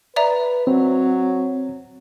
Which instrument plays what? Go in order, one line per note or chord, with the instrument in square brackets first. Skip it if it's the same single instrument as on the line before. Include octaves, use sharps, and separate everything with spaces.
[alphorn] B4 [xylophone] D5 E5 A#5
[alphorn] F#3 [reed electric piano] C4